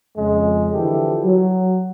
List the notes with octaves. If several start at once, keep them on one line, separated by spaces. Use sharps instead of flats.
F2 C#3 G#3
D3 E3 F3 E4 G4 A4
F#3